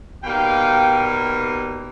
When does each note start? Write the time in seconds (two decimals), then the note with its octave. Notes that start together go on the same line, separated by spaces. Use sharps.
0.23 B2 G3 A#3 D#4 F5 G5